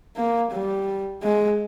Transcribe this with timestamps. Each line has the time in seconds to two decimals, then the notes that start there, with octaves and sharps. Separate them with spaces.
0.16 A#3
0.52 G3
1.23 G#3